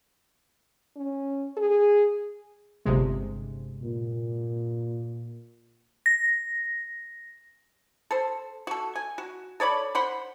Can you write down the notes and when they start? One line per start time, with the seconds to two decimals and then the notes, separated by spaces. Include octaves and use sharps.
0.96 C#4
1.57 G#4
2.85 G1 C3 G#3
3.83 A#2
6.06 A#6
8.11 A4 C5
8.67 F#4 A4
8.95 G#5
9.18 F#4
9.60 A4 C#5 D5 B5
9.95 C5 F#5 B5 C6